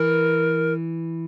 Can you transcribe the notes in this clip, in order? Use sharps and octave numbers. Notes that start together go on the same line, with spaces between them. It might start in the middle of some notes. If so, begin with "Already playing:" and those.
Already playing: E3 A#4